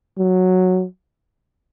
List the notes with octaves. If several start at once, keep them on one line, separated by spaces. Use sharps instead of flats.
F#3